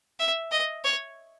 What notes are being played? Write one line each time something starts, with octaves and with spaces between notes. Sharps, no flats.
E5
D#5
C#5